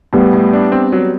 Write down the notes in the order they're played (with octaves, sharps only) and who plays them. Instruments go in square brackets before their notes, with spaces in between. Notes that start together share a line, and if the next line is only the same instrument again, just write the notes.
[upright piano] A2 [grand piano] G3 B3
[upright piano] A2
D4
C4
F#3